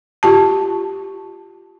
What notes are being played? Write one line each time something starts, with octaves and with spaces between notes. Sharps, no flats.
F4 G4 A5